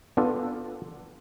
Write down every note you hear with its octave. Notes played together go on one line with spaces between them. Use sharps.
B3 D4 F4 A4